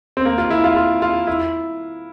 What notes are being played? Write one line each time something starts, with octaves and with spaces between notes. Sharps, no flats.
C4
A#3
F4
E4
F4
F4
F4
E4